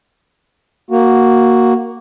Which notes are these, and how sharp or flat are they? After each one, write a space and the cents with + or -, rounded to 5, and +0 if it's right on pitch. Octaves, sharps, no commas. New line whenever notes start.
A#3 +0 F#4 +0